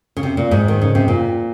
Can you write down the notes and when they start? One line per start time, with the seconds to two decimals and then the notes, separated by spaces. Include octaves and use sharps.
0.17 C#3
0.23 C3
0.37 A#2
0.51 G#2
0.68 D#3
0.81 C#3
0.95 C3
1.08 A#2